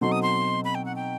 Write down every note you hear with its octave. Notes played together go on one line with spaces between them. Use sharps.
B2 F#3 C4 D#4 A4 C6
D#6
C6
B5
G5
F#5
G5